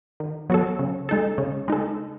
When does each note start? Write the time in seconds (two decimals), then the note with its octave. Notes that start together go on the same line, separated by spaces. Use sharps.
0.20 D#3
0.50 F#3 B3 F#4 A4
0.79 C#3
1.09 G#3 D#4 A4
1.38 C#3
1.68 G#3 D#4 A4